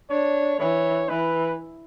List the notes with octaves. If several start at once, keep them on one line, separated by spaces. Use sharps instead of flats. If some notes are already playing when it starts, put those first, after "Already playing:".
D4 C#5
E3 C#5
E3 B4